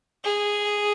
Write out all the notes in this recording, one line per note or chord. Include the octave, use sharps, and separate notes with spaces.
G#4